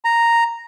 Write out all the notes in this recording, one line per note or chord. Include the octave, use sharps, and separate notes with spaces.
A#5